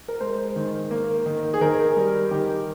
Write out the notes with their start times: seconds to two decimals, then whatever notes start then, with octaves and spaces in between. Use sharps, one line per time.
0.08 A#4
0.20 G#3 C5
0.56 D#3
0.91 A#3
1.26 D#3
1.54 G#4
1.61 D#3 A#4
1.97 G3
2.31 D#3 G4